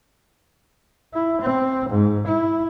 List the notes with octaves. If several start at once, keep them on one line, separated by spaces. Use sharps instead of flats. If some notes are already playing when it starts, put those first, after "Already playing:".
E4
C4
G#2
E4